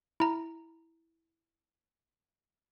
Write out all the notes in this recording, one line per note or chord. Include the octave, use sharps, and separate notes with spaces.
E4 A#5